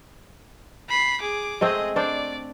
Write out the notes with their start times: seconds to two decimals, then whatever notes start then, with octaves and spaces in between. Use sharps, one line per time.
0.89 B5 C7
1.21 G#4 D6
1.61 G#3 A3 C4 G#4 D#5
1.96 D4 C5 D5